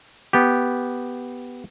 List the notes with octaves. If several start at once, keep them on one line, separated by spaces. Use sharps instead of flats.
B3 G4